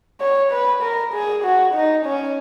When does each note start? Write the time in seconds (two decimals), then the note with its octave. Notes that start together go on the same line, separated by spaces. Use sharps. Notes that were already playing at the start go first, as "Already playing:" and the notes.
0.21 C#5
0.52 B4
0.82 A#4
1.13 G#4
1.44 F#4
1.74 D#4
2.05 C#4